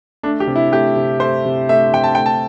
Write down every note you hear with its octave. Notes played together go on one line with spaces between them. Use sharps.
A3 D4
G4
C3
E4
A3 G4
C3
A3 C5
C3
A3 E5
C3 G5
A5
A3 G5
A5